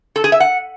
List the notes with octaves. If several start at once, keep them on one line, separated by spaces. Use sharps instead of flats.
A4
G#4
E5
F#5